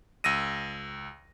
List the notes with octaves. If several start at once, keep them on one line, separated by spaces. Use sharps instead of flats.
C#2 E6 A#6 D#7